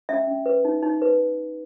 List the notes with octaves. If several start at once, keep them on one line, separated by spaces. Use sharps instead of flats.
C#4 E5
C#4
B4
D#4
D#4
B4